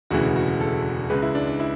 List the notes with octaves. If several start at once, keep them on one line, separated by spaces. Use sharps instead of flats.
E1 D2 C#3 E3 F#4
F#4
A4
C#2 C#3 G#3 B4
E4
D4
D4
E4